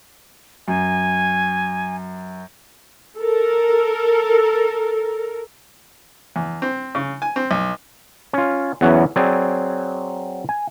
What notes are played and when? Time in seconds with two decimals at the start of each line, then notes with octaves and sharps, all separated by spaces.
0.68 F#2 G#5
3.19 A4 A#4
6.36 E2
6.62 C4
6.95 C#3
7.22 G#5
7.36 C4
7.51 B1
8.33 C#4 F4
8.81 E2 E3 F#3 B3 C#4
9.16 F#3 C4 G#4 D5
10.49 G#5